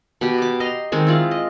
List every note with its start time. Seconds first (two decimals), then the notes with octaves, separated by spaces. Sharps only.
0.21 B2 G4
0.38 G4 D6
0.60 D#5 A#5 C6
0.92 D#3 G#3 C4
1.07 E4 F4 D5
1.31 D#5